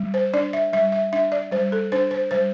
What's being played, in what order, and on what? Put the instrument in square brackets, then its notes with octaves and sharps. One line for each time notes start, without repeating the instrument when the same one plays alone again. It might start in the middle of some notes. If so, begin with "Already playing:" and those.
Already playing: [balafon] G3
C5
D4 D5
E5
G3 E5
E5
D4 E5
D5
G3 C5
A4
D4 C5
C5
G3 C5